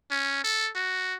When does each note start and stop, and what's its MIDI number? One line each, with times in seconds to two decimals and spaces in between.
0.11 0.44 61
0.44 0.70 69
0.75 1.15 66